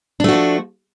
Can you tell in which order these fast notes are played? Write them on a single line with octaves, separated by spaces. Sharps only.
D4 A3 F#4 F3